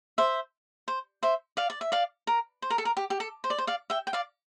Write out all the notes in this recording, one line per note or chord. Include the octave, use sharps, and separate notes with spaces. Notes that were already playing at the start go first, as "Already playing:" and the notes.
C5 E5
C5
C5 E5
D5 F5
D5
E5
D5 F5
A#4
C5
A#4
A4
A#4
G4
G4
A4
C5
D5
C5
D5 F5
E5 G5
G5
D5 F5